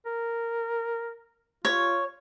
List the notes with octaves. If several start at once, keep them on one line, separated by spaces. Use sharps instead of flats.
A#4
F4 C#5